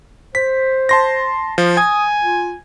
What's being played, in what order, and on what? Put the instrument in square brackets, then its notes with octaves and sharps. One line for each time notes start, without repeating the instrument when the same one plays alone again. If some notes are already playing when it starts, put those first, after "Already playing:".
[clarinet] C5 [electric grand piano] B6
[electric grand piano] A5 C6 A#6
F3
[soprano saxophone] G#5 [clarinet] D#6 [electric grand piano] G#6
[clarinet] F4